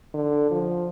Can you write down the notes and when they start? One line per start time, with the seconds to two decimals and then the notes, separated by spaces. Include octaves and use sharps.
0.14 D3
0.51 F3